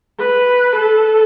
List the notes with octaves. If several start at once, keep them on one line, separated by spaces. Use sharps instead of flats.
B4
A4